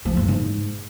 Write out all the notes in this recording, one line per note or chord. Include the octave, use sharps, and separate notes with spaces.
F3
G2
G#2